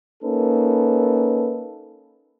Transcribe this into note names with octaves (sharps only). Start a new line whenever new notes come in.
A#3 C#4 D#4 A4 B4